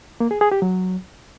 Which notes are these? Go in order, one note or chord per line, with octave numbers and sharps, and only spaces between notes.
A#3
G#4
G#4
G4
F#3